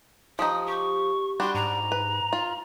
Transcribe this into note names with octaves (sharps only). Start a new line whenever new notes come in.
F3 D#4 G4 D#6
G4 C#6
G3 D4 F#4 C6
G#2 A#5
B4
F4